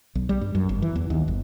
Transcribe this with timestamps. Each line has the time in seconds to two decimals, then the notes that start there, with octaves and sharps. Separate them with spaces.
0.15 B1
0.29 G3
0.41 G2
0.55 F#2
0.69 G1
0.82 E3
0.96 E2
1.10 D#2
1.28 G1